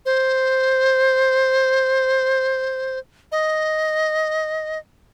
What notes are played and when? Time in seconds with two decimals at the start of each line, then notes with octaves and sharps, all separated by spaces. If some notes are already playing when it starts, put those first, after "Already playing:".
0.06 C5
3.32 D#5